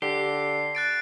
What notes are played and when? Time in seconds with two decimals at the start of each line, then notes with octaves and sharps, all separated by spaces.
0.02 D3 G4 C7
0.75 F#6 A6 D7